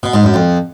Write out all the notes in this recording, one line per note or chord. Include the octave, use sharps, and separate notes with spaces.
B2
G#2
F#2
F2